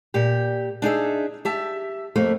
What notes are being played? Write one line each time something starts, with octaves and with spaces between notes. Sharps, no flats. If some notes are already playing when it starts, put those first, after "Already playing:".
A#2 G4
D4 D#4 G#4 E5
G4 E5 A5
F2 A3 A#3